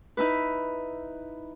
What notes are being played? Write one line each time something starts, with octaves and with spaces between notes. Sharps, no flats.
D#4 E4 B4